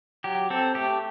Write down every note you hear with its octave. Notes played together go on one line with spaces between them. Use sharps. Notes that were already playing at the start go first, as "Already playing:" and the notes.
F#3 G4
C4 A4
A3 G4